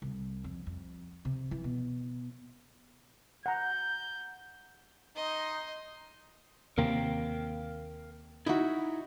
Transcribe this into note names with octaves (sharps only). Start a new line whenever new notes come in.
C2
F2
F2
C3
E3
B2
F#5 A#5 G6
D#4 D#5 C6
D#2 C3 A#3 A#4 F5 G5
D#4 E4 F#4 E5